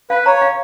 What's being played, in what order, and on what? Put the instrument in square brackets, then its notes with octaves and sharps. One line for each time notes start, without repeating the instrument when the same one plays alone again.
[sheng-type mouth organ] B4 [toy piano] F5
[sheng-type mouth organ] C#5 [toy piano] A#5
[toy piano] F5